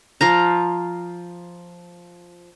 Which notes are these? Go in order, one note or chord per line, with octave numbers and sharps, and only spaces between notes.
F3 F5 A#5